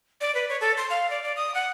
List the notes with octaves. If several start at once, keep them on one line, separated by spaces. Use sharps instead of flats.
D5
B4
C#5
A4
C6
F5
D5
D5
D#6
F#5